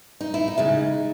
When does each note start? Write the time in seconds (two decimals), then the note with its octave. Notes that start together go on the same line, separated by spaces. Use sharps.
0.21 D#4
0.34 E4
0.48 D#4
0.58 E2 C#3 G#3